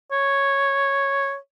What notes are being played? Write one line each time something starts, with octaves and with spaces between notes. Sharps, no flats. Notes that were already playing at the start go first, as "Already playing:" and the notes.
C#5